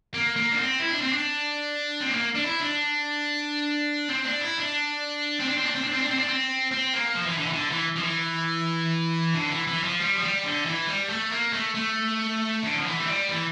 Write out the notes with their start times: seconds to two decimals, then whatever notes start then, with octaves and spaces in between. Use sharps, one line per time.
0.14 A#3
0.36 A#3
0.52 D4
0.58 C4
0.80 E4
0.90 D4
1.01 C4
1.12 D4
2.01 C4
2.11 A#3
2.35 D4
2.44 E4
2.61 D4
4.09 C4
4.24 D4
4.41 E4
4.58 D4
5.40 C4
5.49 D4
5.57 C4
5.66 D4
5.75 C4
5.84 D4
5.93 C4
6.02 D4
6.11 C4
6.19 D4
6.28 C4
6.71 C4
6.93 A#3
7.15 F3
7.26 E3
7.38 D3
7.46 E3
7.53 D3
7.70 E3
7.97 F3
8.03 E3
9.35 D3
9.51 E3
9.67 E3
9.84 F3
10.00 G3
10.16 F3
10.22 G3
10.44 D3
10.66 E3
10.87 G3
11.09 A3
11.32 A#3
11.53 A3
11.75 A3
12.63 D3
12.75 F3
12.85 E3
12.99 A3
13.07 G3
13.29 E3